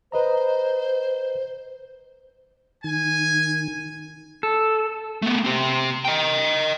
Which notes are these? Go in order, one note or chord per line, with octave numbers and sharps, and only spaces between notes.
B4 C5 D#5 A#5
D#3 G#5
A4
A3 B3
C4 G4
D#5 G5